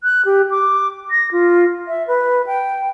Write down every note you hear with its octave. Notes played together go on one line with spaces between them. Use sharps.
F#6
G4
D6
A#6
F4
E5
B4
G5